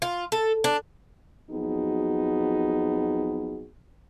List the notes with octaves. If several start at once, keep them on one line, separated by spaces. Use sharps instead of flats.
F4
A4
D4
F2 F#3 B3 D#4 F#4 G#4